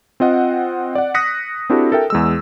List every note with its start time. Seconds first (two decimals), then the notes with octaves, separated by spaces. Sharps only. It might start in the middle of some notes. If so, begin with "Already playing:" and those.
0.20 C4 F4 D#5 F#5
0.95 D5 F#5
1.14 D#6 F#6 A#6 B6 C#7
1.70 C4 D4 E4 F#4 G4 A4
1.92 A4 A#4 E5 G5
2.10 E2 G#3 E6